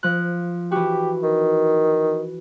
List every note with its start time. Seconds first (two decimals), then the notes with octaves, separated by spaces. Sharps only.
0.03 F3 F#6
0.72 E3 F#4 G4
1.23 D#3